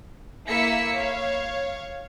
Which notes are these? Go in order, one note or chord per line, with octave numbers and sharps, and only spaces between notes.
A#3 E4 E5 E6 B6 C#7
C#5 F5